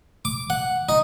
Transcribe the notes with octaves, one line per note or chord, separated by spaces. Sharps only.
D6
F#5
D#4